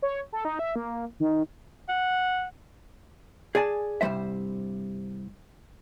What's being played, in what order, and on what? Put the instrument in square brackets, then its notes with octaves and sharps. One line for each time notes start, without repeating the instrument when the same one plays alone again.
[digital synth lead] C#5
A4
D#4
E5
A#3
D#3
[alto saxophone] F#5
[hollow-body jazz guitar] G#4 D5 G#5 A5
C2 G2 D#3 G3 C5 E5